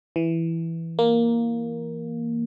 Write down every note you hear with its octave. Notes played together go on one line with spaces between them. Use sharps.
E3
A#3